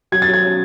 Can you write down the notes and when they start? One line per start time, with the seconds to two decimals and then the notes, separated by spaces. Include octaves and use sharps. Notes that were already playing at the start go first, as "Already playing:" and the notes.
0.12 F#3 G#6
0.22 A6
0.28 F#3
0.33 G#6
0.43 C#4